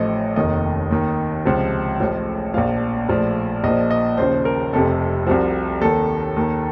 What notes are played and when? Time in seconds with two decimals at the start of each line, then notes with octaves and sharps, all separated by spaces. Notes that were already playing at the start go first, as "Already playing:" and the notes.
Already playing: A1 A2 F3 D#5
0.36 F1 D#2 D#3 D#5
0.91 D#2 D#3
1.46 C#2 C3 F3
2.00 A1 A2 F3
2.54 A#1 A#2 F3 F5
3.09 A#1 A2 F3
3.64 A#1 A#2 F3 D#5
3.91 D#5
4.17 D#2 C#3 F3 C5
4.45 A#4
4.73 F1 F2 C3 A4
5.27 C2 C3 F3 F#4
5.81 D#2 D#3 A4
6.36 D#2 D#3